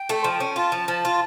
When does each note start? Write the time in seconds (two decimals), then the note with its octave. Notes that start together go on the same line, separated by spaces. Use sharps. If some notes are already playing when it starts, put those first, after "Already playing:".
Already playing: G5
0.09 A3
0.24 F3
0.40 C#4
0.56 F4 A5
0.72 F3
0.88 F3
1.05 F4